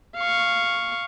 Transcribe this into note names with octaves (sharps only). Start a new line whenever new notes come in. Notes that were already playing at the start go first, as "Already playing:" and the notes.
F5 C#6